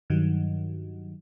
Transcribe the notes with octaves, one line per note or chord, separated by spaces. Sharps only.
G2 D#3 F#3